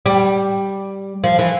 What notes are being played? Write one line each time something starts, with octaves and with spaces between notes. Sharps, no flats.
G3
F3
E3